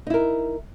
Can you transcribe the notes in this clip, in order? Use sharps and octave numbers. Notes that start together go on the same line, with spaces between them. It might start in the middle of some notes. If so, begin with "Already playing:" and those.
D#4 E4 A#4